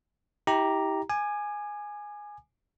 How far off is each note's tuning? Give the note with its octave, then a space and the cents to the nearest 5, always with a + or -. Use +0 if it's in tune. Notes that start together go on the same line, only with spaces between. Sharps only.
E4 -40 G4 +0 A#5 +0
G#5 +0 D6 +40